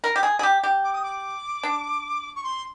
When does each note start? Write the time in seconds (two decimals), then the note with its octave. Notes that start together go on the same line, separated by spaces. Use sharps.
0.04 A#4
0.16 G4
0.23 G#4
0.39 G#4
0.43 G4
0.63 G4
0.84 D6
0.93 D#6
1.03 D6
1.63 D4
2.36 C#6
2.44 C6